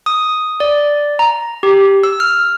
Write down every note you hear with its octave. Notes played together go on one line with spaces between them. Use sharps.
D#6
D5
A#5
G4
E6
F6